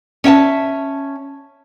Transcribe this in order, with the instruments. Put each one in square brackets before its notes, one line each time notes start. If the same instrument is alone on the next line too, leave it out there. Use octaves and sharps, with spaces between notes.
[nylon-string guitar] C#4 E5 G5 A5